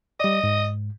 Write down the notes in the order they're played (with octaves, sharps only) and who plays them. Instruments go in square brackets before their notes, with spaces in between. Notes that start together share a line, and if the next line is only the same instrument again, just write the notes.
[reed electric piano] G3 D5 [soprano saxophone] D#5
[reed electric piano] G#2